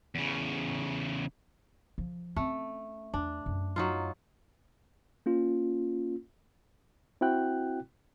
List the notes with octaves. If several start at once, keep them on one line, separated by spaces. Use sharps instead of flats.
E2 C#3
F3
A3 C4 C#4
E2 D4
F#2
F#3 D#4 F4
A#3 C#4 F4
C4 E4 F#4 G5 F#6